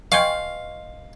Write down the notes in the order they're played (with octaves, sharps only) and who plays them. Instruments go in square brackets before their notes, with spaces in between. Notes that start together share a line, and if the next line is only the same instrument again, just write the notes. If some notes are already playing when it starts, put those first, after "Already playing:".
[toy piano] B4 D#5 C6 [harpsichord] F5 [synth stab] G5 G#5 C#6